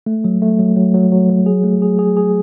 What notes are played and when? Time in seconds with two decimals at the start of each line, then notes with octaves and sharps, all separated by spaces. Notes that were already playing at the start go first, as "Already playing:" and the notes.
0.06 A3
0.24 F#3
0.42 A3
0.59 F#3
0.77 F#3
0.94 F#3
1.12 F#3
1.30 F#3
1.46 G#4
1.64 A3
1.82 G#4
1.99 G#4
2.17 G#4